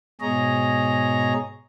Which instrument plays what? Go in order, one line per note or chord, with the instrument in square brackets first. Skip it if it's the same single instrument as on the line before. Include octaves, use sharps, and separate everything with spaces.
[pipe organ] G#2 B2 G#4 C#5 D#5 A#5